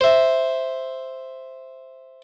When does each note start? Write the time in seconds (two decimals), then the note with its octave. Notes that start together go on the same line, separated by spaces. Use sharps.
0.01 C5 E5